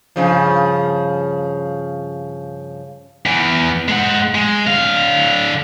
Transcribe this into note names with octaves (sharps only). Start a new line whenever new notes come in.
G2 C#3 F3
E2 E3
G#3 F#5
G#3
D3 F5